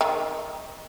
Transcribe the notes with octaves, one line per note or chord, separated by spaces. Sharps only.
D#3